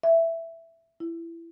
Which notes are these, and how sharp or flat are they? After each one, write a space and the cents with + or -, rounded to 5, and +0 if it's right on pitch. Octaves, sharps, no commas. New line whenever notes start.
E5 +5
E4 +20